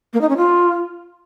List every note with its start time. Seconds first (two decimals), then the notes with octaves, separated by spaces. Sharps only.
0.13 A#3
0.21 D#4
0.29 C#4
0.37 F4